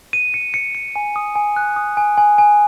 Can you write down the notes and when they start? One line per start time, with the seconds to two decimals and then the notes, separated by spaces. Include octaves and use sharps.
0.13 D#7
0.34 C#7
0.54 C#7
0.75 C#7
0.96 G#5
1.16 D#6
1.36 G#5
1.56 F#6
1.76 D#6
1.97 G#5
2.18 G#5
2.38 G#5